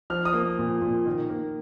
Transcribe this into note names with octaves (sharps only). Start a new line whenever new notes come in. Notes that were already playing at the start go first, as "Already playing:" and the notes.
F3 F6
D#6
A#3
A#2
A#2
D#3
A#3